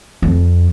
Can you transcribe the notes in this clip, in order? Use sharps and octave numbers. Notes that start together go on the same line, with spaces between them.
F2